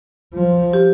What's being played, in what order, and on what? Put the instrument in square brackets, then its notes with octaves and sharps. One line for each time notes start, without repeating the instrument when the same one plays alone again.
[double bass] F3
[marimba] G4